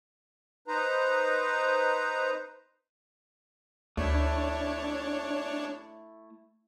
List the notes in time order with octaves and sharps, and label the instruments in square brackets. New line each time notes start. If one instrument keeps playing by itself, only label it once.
[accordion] D#4 B4 C5 A#5
[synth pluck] D2 [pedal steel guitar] A3 E4 [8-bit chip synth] D4 C#5